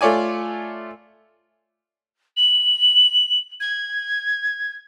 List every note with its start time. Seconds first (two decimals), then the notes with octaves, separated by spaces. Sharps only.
0.01 A3 F4 C#5 D5 G#5
2.37 F#7
3.60 G#6